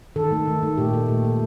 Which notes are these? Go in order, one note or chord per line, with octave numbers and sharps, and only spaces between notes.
D#3 A4
A3
D#3
A3
A#2 G4
A3
A#2
A3